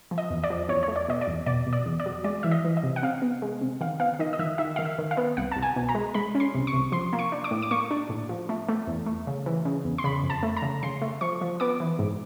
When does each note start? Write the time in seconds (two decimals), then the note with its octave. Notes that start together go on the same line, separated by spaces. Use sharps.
0.11 F3
0.18 D#5
0.30 E2
0.44 D5
0.50 F3
0.69 E2 C#5
0.83 C#5
0.88 A3
0.96 D5
1.08 B2 D#5
1.21 D5
1.27 E2
1.46 B2 D5
1.66 B2
1.73 D5
1.86 E2
2.00 D5
2.06 F#3
2.24 G#3 D5
2.43 E3 E5
2.51 D#5
2.65 E3
2.77 D#5
2.83 C3
2.96 F#5
3.03 C3 F5
3.22 B3
3.42 G#3
3.61 C3
3.81 D#3 F5
4.00 B3 F5
4.19 D#3 D#5
4.33 D#5
4.39 D#3 E5
4.58 D#3 E5
4.76 D#3 F5
4.85 E5
4.98 D#3
5.11 F5
5.17 B3
5.37 C2 F#5
5.52 C2 A5
5.63 G#5
5.76 B2
5.89 A#5
5.95 G#3
6.14 G#3 B5
6.35 C#4
6.40 C6
6.54 C2
6.67 C#6
6.73 C2
6.92 F3 C6
7.13 A#3
7.19 C#6
7.32 D4
7.44 D6
7.51 A2
7.62 D6
7.71 A#3 C#6
7.91 D4
8.09 A2
8.29 F3
8.49 A3
8.69 A3
8.87 E2
9.06 A3
9.27 C#3
9.46 E3
9.65 C#3
9.85 E2
9.98 C6
10.04 C#3 B5
10.23 F2
10.30 A5
10.43 A3
10.57 A#5
10.62 C#3
10.83 C#3 C6
11.02 A3
11.21 F3 C#6
11.41 F3
11.60 B3 D6
11.80 E3
11.99 G#2